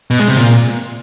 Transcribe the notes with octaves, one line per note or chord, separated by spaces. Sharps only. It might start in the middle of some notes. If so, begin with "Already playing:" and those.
B2
G#3
C3
A#2